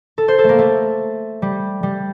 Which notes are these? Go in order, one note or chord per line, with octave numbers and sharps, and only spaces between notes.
A4
C5
A4
A3 A#3
A3
G3
G3